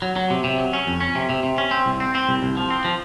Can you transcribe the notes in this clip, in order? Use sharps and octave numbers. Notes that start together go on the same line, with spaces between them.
F#3
F#3
C3
C3
F#3
C#4
F2
C#4
C3
C3
C3
C#4
C4
C2
C4
C4
C2
C2
F3
C4
F3